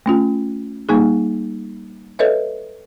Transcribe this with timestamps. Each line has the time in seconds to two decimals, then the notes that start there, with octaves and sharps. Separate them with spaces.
0.06 A3 C#4 F4
0.89 G3 A#3 D#4 G#4
2.19 A4 B4 C#5 D#5 E5